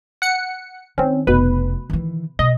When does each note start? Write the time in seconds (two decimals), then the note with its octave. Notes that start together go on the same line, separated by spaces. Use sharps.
0.22 F#5 C#7
0.98 D#3 C4 C#4
1.27 F1 B2 B4
1.90 D#3 E3
2.39 B2 D#5